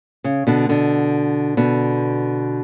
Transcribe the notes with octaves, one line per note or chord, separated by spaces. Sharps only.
C#3
B2 D3
B2 D3
B2 D3